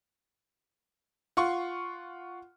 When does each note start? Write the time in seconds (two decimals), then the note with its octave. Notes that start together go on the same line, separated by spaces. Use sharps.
1.37 F4 F#5 C6 C#6